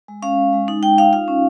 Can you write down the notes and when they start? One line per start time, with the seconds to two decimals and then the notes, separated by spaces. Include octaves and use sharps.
0.08 G#3
0.22 C#4 F5
0.37 G#3
0.53 G#3
0.68 D#4
0.83 D#4 G5
0.98 D#4 F5
1.13 F4 F5
1.28 C#4